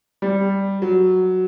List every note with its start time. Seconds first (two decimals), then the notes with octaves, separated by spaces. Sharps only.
0.22 G3
0.82 F#3